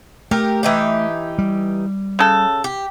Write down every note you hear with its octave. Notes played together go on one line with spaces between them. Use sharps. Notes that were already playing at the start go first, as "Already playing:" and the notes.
A3 G4 A#4
E3 D#4 G4
G3
C#3 A4
G4